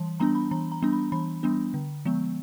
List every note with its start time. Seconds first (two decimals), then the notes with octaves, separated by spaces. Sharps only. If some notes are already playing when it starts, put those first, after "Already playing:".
Already playing: E3 G3 A5
0.20 G3 B3 D4 A#5
0.35 B5
0.51 E3 A#5
0.72 A#5
0.82 G3 B3 D4
0.93 B5
1.12 E3 B5
1.43 G3 B3 D4
1.74 D3
2.05 F3 G#3 B3